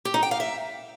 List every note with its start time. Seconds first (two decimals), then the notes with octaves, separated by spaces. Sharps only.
0.05 G4
0.14 D#4
0.23 G5
0.31 F5
0.40 E5